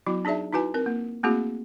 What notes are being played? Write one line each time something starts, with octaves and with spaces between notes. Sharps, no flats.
F#3 B3 E4 F#4
D4 D#4 G#4 D5 E5
D#4 E4 F#4 B4 G#5
C4 A#4
A#3
A3 A#3 C4 E4 F#4 G#4